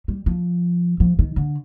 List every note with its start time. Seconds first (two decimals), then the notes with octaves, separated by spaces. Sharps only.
0.08 G3
0.26 F3
1.00 F3
1.19 D#3
1.36 D3